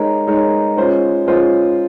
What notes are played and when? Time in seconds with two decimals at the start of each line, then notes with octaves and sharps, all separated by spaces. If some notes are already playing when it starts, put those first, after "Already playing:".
Already playing: G#3 D#4 A#4 C#5
0.27 G#3 D#4 A#4 C#5
0.77 G#3 C#4 F4 C5
1.27 G#3 C#4 F4 C5